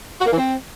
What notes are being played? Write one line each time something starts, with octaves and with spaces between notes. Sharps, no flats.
F#4
A#3
E3
C4